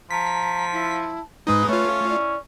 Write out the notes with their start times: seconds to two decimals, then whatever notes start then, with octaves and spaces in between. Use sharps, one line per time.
0.11 F3 A5 A#5 B6
0.73 E4
1.47 G#2 G#3 D#4 B4 D#6
1.69 A3 C#4 F4 C#5
2.09 E4 D5